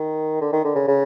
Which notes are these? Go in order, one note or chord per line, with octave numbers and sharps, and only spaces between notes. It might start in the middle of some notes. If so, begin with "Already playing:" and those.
Already playing: D#3
D3
D#3
D3
C#3
C#3